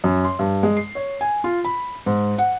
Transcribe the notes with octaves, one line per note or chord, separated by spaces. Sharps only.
F#2
C6
G2
G#3
C7
C#5
G#5
F4
B5
G#2
F#5